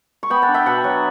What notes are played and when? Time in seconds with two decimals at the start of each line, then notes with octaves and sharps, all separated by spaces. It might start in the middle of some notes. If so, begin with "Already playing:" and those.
0.23 C#6
0.30 B3 G5 B5
0.42 F#5 A5
0.48 D4
0.54 E5 G5
0.66 B2 F#5 A5
0.84 F#3